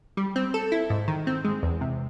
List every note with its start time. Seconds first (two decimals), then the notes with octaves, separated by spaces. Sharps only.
0.17 G3
0.36 C4
0.54 A4
0.72 E4
0.90 G#2
1.08 D#3
1.27 C4
1.45 G#3
1.63 E2
1.81 C3